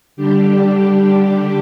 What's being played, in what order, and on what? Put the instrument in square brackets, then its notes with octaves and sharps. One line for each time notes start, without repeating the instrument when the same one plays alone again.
[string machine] D3 G3 D4 G4